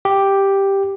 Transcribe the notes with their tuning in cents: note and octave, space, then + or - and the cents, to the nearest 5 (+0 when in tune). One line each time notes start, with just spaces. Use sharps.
G4 +0